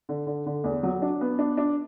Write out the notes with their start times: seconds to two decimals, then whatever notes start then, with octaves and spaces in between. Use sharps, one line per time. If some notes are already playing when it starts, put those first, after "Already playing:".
0.09 D3
0.27 D3
0.46 D3
0.64 E2
0.83 F#3
1.02 D4
1.21 B3
1.39 D4
1.57 D4